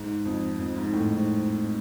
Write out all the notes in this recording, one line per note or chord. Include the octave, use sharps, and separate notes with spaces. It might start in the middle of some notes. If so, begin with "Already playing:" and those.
Already playing: G#2
F2
F2
G#2
A2
G#2